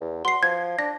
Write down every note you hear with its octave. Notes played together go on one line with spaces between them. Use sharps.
E2
F#4 C6 C7
F3 G#6
D4 A#6